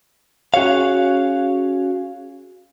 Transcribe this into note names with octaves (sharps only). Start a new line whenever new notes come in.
C#4 F#4 G#4 C#5 F5